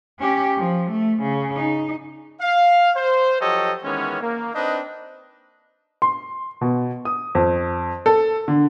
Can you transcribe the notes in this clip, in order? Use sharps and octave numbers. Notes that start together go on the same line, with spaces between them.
C#4 G4
F3
A3
C#3
D#4
F5
C5
F3 F#3 G4 A4 C#5 D#5
D#3 E3 G#3 B3 C#4
A#3
C4 D4 D#4 B4 D#5
C6
B2
D#6
F2
A4
D3